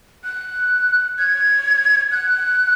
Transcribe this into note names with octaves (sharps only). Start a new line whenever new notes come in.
F#6
G#6
F#6